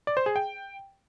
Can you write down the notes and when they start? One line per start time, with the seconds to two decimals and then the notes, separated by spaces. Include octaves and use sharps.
0.07 D5
0.17 C5
0.26 G#4
0.36 G5